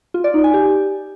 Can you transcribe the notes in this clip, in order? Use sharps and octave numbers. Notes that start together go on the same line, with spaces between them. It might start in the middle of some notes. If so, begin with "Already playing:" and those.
F4
D5
D#4
G#5
G4